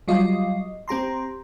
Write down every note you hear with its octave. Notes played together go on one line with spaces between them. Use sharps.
F#3 G3 F4 D#5
C4 G4 A#5 C6